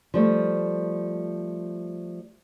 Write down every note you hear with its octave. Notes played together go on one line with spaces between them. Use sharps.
F3 G3 A3